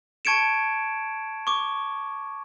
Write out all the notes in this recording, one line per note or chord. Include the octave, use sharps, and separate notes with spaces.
A5 C#6 G#6 C#7 D7 E7
C#6 D6